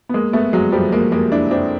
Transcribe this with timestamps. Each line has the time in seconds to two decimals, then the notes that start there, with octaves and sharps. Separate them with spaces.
0.09 B3
0.14 G#3 A#3
0.33 A3 B3
0.53 F#3 G#3
0.72 F3 G3
0.92 G#3 A#3
1.12 G#3 A#3
1.32 D4 E4
1.51 C4 D4